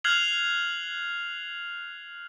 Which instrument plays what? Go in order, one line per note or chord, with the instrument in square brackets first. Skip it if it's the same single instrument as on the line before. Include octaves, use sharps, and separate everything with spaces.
[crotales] F6 F#6 G#6 C7 F7 F#7